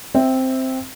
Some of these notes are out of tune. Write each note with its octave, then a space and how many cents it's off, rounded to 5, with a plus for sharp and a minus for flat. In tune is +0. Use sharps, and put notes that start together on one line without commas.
C4 +0 E5 -5